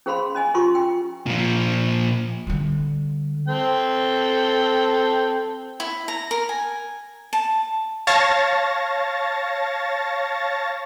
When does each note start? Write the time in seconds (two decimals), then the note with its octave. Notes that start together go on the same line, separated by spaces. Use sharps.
0.06 C#4 G#4 C5 F5 B5 C6
0.35 C#4 D#5 G#5
0.54 C#4 F4 G4 C6 C#6
0.75 G5
1.26 A#2 F3
2.47 D3 G3
3.48 C4 A4 G5
5.80 E4
6.08 A#5
6.31 A#4
6.49 G#5
7.33 A5
8.07 C#5 F5 A5 C#6 A6 A#6